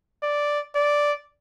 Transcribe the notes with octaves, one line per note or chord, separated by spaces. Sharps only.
D5
D5